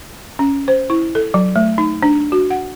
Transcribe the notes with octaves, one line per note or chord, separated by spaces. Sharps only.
C#4
C5
E4
A4
F#3
A3
D#4
D4
F#4
F#5